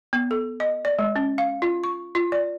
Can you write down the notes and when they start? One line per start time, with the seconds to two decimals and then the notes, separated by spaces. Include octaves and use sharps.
0.13 B3
0.31 A4
0.60 D#5
0.85 D5
0.99 G#3
1.16 C#4
1.38 F5
1.62 F4
1.84 C#6
2.15 F4
2.32 D5